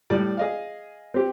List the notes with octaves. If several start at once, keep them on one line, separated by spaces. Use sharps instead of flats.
A2 G3 D5
G#4 D#5 F5
C4 G4